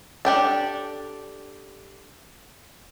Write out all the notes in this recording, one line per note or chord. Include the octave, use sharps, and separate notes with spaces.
D4 G4 A4